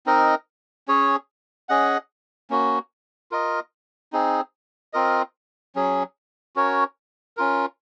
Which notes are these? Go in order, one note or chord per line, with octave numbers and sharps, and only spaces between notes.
C4 D#4 A#4 D#5
C#4 G#4 C#5
C#4 G#4 D#5 F#5
A#3 C#4 F#4
F4 A#4 D#5
C4 D#4 G#4
C4 F4 A#4 D#5
F#3 C#4 G#4
C#4 F#4 A#4 C#5
C#4 F4 A#4